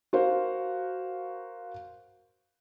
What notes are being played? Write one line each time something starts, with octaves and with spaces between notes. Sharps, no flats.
F#4 A#4 C5 F5